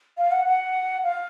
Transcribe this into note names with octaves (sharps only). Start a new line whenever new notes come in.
F5
F#5
F#5
F5